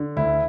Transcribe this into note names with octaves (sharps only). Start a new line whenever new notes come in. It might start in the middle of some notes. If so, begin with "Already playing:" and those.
Already playing: D3
D2 E4